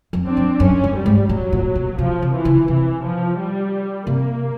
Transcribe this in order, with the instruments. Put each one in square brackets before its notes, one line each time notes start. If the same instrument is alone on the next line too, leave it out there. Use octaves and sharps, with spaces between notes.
[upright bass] F2
[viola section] C4 D4
[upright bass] F#2
[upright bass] F#2 [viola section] C#4
[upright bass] G2
[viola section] G3
[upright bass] G#2
[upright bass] A2 [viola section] F#3
[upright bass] A#2
B2
[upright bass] C3 [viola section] F3
[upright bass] C3
[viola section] E3
[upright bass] C#3
[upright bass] C3 [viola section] E3
[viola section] F3
G3
[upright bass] C3 [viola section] A#3